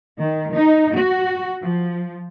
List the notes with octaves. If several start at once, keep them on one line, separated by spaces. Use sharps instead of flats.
D#3
D#4
F#4
F3